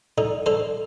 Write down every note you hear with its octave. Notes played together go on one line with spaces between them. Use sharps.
D3 D#4
D3 A4 C5